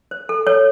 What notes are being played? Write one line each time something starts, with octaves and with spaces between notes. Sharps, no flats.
C5
A4
A4 C#5